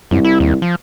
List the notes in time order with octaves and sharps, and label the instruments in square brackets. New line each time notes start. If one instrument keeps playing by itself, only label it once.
[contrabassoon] C2 [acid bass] F#2
[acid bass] E4
D#2
F3